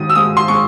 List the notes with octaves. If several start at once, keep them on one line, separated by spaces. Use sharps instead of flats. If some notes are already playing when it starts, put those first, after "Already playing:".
Already playing: D#3 G#3 D#6
E6
G#3 D#6
C6
G#3 C#6